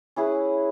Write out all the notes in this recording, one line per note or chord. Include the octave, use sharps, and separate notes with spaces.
C#4 E4 G#4 B4